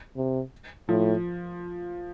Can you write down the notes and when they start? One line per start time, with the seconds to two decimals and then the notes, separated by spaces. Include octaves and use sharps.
0.16 C3
0.89 A2 F3